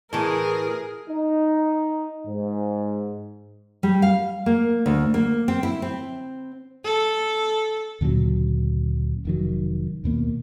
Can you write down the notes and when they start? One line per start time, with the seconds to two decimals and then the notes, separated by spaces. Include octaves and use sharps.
0.13 A2 E3 G#4 A#4
1.09 D#4
2.27 G#2
3.83 G3
4.02 F5
4.46 A#3
4.86 D2
5.14 A#3
5.48 C4
5.63 E4
5.82 C4
6.84 A4
8.01 D2 A#2 C#3 F#3
9.25 F1 D#3 F#3
10.04 D#2 B2 A#3